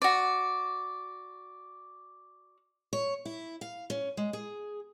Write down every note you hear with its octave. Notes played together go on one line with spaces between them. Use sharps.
F#4 D5
C#5
E4
F5
C#4
G#3
G#4